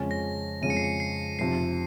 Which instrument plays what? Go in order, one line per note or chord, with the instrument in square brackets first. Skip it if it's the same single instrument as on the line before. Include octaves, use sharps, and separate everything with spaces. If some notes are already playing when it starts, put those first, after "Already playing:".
Already playing: [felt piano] F2 C#3 G#3 C#4
[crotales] A#6
[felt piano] F2 C#3 G#3 C#4 [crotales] D#7
[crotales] C#7
C7
C#7
C7
[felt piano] F1 F2 C3 [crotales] C7